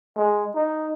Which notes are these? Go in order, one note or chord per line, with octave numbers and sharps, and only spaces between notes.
G#3
D#4